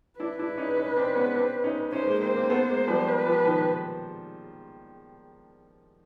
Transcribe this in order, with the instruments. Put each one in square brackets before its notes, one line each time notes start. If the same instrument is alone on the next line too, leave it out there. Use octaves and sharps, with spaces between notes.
[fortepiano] D4 E4 [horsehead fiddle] B4
[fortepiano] D4 E4
C#4 D#4
C#4 D#4
C4 D4
B3 C#4
C4 D4
C#4 D#4
[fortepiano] C#4 D#4 [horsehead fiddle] C5
[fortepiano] G#3 A#3
[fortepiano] A#3 C4 [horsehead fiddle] C5
[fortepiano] A#3 C4
A3 B3
G#3 A#3
F3 G3
[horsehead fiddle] B4
[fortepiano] F3 G3
D#3 F3